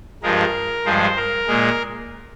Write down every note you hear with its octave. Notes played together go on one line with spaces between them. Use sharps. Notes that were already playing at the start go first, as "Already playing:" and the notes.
G2 F3 G#3 A#4
G2 F3 G#3 C5
A#4
A#2 G#3